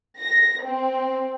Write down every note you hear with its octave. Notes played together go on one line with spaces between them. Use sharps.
A#6
C4